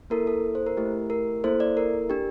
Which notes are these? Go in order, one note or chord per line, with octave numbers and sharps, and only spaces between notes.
A#3 E4 A4 A#4
A4
C5
A#4
A3 E4 G4
A#4
A#3 E4 A4 C5
D5
A#4
D4 G4